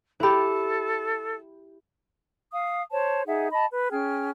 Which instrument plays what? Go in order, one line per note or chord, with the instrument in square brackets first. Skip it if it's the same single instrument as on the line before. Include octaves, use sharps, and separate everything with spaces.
[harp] E4 G4 [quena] A4 [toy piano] C5 B5
[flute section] F5 D#6
C5 C#5 A5
D#4 G#4 E5 F#5
D#5 A5 B5
B4
C#4 G#4 G5 F6